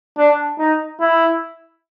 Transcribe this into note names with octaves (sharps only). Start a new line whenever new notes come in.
D4
D#4
E4